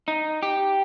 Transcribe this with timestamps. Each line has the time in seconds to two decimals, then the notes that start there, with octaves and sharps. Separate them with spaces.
0.08 D#4
0.43 G4